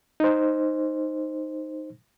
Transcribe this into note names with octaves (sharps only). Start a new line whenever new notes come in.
D#4 C5